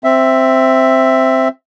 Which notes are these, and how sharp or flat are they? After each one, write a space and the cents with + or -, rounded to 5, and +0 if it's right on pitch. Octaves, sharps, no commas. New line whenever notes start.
C4 +0 E5 +5